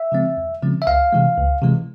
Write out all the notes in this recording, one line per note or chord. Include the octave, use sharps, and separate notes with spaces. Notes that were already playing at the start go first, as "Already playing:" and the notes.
Already playing: E5
C#3 F3 G#3 C4
E2
C#3 F3 G#3 C4
E5
C#2 F5
C3 E3 G#3
C#2
C3 E3 G#3